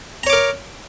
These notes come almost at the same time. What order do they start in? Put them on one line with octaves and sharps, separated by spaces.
A#5 C#5 D6 A#4